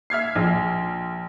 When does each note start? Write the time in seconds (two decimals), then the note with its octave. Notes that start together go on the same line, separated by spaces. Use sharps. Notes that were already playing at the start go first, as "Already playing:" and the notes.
0.10 E5 F6 G#6 C7
0.35 A#1